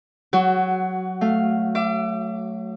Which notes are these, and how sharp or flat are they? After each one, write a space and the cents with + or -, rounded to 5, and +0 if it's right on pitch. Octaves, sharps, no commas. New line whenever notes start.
F#3 +0 F#4 +20
A3 +0 F5 +0
E5 +40 D6 +0